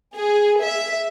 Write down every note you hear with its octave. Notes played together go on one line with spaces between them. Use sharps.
G#4
E5